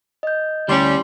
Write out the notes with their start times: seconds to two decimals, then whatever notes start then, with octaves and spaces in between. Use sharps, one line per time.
0.23 D#5 G6
0.68 D2 G3 C#4 E4 C6 C7